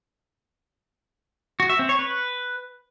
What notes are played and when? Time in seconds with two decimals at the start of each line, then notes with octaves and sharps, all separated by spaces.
1.60 F#4
1.69 E5
1.79 C4
1.89 C#5
1.99 B4